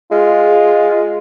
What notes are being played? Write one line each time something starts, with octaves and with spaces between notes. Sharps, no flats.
G#3 F4